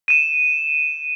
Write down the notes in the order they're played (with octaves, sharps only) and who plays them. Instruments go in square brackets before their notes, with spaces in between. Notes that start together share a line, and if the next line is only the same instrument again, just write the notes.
[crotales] D#7 E7